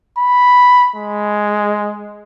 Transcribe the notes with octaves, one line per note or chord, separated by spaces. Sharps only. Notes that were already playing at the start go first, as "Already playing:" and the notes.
B5
G#3